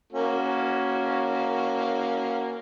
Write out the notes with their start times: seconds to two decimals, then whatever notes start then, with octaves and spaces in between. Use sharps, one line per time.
0.13 A#3 C#4 F#4